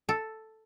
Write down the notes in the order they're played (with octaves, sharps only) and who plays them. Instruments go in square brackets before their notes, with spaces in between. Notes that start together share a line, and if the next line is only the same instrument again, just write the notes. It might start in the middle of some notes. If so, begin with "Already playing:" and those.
[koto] A4